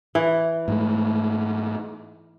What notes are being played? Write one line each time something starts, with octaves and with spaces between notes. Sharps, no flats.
E3
G#2 A3